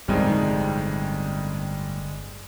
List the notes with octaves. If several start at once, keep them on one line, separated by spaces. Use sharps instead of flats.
G1 C2 F2 A2 D#3 G3 G#3